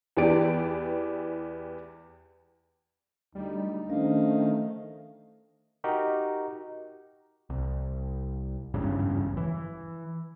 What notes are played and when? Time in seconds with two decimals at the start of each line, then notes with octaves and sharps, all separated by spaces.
0.17 E2 E3 G4 D5 D7
3.35 D2 G3 D#4
3.90 D#3 F3 A3 C#4 D4 D#5 F5
5.84 D#4 F#4 G4 A#4
7.50 C2
8.74 G#1 E2 G2 C#3
9.37 E3